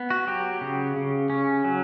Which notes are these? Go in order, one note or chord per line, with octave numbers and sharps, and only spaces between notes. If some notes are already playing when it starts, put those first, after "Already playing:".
Already playing: B3
F#4
F#3 G4
C#3
C#3
C#4
F#3